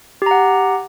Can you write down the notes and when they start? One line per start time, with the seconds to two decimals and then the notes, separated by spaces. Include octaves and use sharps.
0.22 G4
0.26 A#5
0.31 F#5